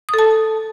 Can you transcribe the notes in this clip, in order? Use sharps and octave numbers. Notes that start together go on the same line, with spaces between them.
A4 A5 D#6